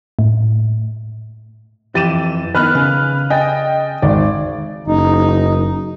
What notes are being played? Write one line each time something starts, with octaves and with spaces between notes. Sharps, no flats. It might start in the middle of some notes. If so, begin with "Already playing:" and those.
A2
F2 E3 G4 A6 D#7 E7
D#3 B3 D#4 B4 F6 F#6
C#3
D#5 G5 G#5 A6
G#1 D5
F#1 D#4